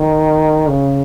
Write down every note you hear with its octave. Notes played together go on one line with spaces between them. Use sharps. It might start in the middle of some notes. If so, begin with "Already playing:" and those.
Already playing: D#3
C#3